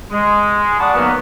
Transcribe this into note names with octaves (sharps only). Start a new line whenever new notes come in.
G#3
D5 F#5 A5 B5 C#6 D#6
D#3 F#3 A#3 B3